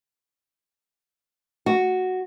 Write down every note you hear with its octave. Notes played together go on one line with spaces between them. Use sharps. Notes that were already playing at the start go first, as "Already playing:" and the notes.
F#4